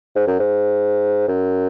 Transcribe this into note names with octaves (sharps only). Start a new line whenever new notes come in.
G#2
F#2
G#2
F#2